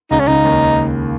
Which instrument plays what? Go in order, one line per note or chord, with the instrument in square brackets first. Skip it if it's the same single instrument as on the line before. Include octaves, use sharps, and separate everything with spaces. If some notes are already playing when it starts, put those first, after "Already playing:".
[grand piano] C#2 C#3 [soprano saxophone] D#4
[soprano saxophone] C#4
[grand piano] C#2 C#3 [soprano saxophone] D#4
[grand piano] D#2 D#3